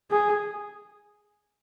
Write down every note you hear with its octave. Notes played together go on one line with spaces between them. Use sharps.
G#4